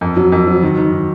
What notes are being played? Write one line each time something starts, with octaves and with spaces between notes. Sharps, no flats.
F2
F#3
F2
F#3
D#3
D#3
D#3